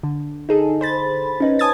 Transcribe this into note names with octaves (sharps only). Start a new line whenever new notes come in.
D3
D#4 G#4 A4
C5 B5 A6
C#4 D#4 B4
G#5 A5 D#6 G#6 A6